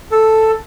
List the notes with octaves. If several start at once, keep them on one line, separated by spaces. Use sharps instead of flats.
A4